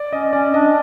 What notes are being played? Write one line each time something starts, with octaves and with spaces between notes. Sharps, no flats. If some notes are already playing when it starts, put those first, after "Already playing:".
Already playing: D5
C#4 D#5
C#4 D5
D4 D#5